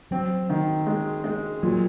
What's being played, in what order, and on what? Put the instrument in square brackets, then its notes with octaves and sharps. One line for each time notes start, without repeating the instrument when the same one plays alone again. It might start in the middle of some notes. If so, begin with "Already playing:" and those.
[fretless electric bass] F#3 [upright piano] C4
[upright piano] D#3
G#3
G#3
[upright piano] A#2 [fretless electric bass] F#3